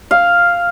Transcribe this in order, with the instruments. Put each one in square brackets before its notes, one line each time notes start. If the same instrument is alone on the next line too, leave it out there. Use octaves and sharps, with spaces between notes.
[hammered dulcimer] F5